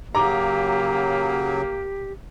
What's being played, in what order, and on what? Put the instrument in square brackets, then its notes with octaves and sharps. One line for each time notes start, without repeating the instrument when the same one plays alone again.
[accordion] C#3 F#3 [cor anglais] A#3 [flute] G4 [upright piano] A#5 D6